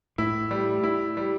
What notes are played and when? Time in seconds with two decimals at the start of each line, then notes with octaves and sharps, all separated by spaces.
0.18 A2 E4
0.51 G3
0.83 E4
1.17 G3